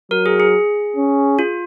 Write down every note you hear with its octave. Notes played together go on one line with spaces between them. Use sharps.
F#3 A#4
G#4
G#4
C#4
F4